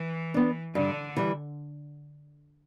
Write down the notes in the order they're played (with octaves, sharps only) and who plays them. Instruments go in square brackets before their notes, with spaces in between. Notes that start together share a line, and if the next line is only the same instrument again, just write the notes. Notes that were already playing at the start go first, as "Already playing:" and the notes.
Already playing: [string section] E3
[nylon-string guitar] B3 D4
[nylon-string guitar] G2 [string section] D3
[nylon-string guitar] E3 G3